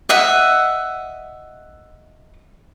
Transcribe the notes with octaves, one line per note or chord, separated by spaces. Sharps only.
D#5 E5 F#5